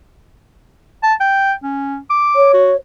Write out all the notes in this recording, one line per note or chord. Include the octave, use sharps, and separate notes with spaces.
A5
G5
C#4
D6
C#5
F#4